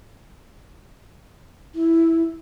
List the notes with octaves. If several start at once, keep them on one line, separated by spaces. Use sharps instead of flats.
E4